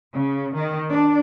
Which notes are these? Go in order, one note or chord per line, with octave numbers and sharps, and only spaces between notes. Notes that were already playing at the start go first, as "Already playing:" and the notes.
C#3
D#3
D4